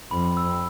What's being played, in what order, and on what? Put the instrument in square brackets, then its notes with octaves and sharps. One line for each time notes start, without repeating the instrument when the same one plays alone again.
[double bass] F2 [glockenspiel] B5
[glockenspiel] E6